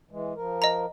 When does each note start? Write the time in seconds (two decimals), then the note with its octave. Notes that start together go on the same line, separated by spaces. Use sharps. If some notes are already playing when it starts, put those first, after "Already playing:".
0.11 E3 G#3
0.36 F3 A#4
0.62 D#5 A#5